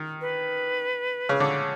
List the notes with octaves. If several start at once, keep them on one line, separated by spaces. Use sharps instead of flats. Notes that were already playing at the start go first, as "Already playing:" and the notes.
Already playing: D#3
B4
C#3
D3 C#5